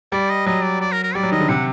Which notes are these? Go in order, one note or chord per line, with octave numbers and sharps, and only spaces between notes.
G3 D5
D#5
F#3 D#5
D5
D5
A#4
A#4
G3 D5
F#3
D#3 D#5
D3
C3 F#5